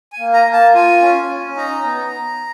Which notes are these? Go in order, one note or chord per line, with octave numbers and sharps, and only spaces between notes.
G#5
A#3
A#5
A#3
A5
F4 G#5
C#4
C#4
D#4 A#5
B3